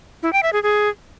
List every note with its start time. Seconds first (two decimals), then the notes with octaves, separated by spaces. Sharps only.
0.23 E4
0.33 G5
0.43 E5
0.53 G#4
0.63 G#4